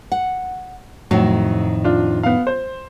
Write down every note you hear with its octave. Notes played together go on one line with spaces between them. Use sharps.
F#5
F2 A2 D#3 F#3
D4 F4
B3 F5
C5